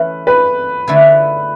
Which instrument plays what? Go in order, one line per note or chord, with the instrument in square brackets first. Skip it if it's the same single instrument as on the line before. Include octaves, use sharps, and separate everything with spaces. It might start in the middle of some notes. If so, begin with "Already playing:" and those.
Already playing: [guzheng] E3 A3 C#4 [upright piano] B4
[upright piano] B4
[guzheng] D3 A3 E4 G#4 B4